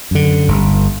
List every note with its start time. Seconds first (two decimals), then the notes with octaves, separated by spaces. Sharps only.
0.11 F#2 D3
0.48 G1